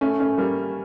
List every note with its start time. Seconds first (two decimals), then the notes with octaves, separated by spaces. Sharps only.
0.01 A3 C#4
0.20 A3 C#4
0.38 G3 A#3